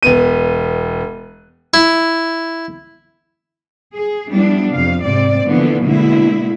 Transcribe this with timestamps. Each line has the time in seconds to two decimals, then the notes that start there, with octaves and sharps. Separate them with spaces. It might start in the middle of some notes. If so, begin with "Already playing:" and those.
0.03 E1 B3 D#7
1.74 E4
3.95 G#4
4.29 F3 G3 B3 D4 E4
4.72 F2 C3 F5
5.03 G#2 C3 C4 D5
5.45 D3 E3 F3 A#3 B3
5.82 B2 D3 G#3 A#3 E4